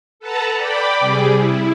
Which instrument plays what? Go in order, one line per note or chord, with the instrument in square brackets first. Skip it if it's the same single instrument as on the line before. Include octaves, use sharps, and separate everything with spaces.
[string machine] A4 B4 F#5 A5 A#5
D5 G5 B5 D6
C3 G3 G#4
E4